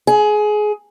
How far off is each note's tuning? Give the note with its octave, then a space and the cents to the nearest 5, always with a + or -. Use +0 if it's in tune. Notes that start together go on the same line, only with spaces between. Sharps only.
G#4 +20